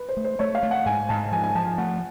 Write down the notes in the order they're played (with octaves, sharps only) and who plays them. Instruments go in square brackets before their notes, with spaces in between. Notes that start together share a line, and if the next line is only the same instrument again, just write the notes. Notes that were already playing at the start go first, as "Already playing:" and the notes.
Already playing: [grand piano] B4
C5
[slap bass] A3
[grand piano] C5
[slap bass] A3 [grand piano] C#5
[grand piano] F5
[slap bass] A3
[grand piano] F#5
[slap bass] G#2 [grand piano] G#5
[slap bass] G#2 [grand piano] A5
[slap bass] F3 [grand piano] G#5
[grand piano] G#5
[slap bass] F3 [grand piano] A5
[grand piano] G#5
[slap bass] A3 [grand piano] F#5